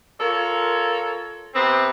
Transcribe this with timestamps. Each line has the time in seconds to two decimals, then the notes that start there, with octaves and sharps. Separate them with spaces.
0.19 F4 A4 A#4 C#5
1.54 C3 B3 C4